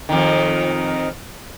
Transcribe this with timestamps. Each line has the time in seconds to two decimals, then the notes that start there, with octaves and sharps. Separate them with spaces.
0.09 F2 D#3